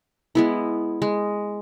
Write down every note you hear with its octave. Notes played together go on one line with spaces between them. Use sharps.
G#3 B3 E4
G#3